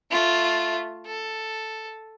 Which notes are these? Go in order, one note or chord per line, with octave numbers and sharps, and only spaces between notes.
A3 F4
A4